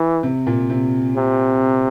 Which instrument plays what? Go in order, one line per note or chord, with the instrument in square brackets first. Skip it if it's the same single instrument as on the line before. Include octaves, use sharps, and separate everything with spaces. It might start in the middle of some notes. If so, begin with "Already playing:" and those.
Already playing: [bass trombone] E3
[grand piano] C3
A#2
C3
[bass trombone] C3